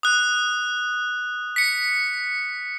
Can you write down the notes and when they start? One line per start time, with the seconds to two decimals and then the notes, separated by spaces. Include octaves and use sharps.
0.03 D#6 F#6
1.56 B6 C#7